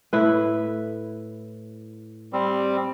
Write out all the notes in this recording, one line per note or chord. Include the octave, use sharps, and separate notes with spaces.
A2 E4 B4
G3 C4